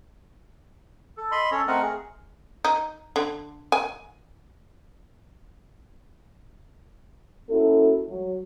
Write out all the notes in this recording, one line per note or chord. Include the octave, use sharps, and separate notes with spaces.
A4
D#5 B5 C6
C#4 A4 C#5
A3 C4 A#4 D#5 F#5
G#4
D#4
D3
G#5
A#3 C#4 E4 F#4 A4
F#3